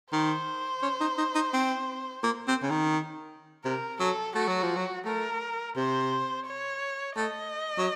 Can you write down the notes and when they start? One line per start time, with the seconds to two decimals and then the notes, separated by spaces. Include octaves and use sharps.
0.12 D#3 C5
0.83 C#4
1.01 D#4
1.18 D#4
1.35 D#4
1.54 C4
2.24 A#3
2.48 C4
2.63 C#3
2.70 D#3
3.65 C3 A#4
4.00 F#3 A4
4.35 A3 F#4
4.48 F#3
4.63 F3
4.76 F#3
5.05 A3 A#4
5.76 C3 C5
6.46 C#5
7.17 A3 D#5
7.78 F#3